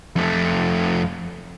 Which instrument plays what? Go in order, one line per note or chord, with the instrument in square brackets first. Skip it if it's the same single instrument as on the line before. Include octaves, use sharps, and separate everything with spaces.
[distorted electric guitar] F2 A3